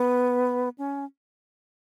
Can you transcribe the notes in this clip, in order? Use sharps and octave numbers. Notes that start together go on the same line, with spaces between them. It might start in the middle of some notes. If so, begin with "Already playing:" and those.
Already playing: B3
C#4